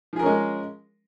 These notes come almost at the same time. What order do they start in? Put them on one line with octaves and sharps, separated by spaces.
F3 G#4 A#4 C#4 G#3